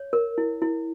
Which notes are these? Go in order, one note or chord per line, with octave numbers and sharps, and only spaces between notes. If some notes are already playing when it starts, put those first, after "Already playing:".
Already playing: C#5
A#4
E4
E4